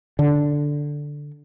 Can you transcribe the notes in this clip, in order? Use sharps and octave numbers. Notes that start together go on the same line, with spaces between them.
D3